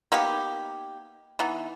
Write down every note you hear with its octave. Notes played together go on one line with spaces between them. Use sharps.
A#3 B3 D#4 G4
E3 B3 D#4